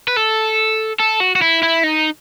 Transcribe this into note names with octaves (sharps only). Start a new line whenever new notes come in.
B4
A4
A4
F#4
F#4
E4
E4
D#4